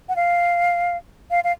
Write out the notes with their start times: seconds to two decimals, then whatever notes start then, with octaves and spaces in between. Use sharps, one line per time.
0.09 F#5
0.16 F5
1.31 F5
1.44 F5